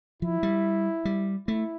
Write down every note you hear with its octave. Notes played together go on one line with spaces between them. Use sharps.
F3 E4
G3
G3
A3 E4